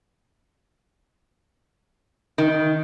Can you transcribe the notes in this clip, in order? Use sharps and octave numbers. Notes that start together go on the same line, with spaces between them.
D#3